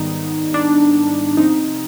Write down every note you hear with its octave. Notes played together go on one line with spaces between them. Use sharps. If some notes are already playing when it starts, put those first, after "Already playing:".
Already playing: G#2 D#3 G3 B3 D#4
D4
C3 F3 C4 D#4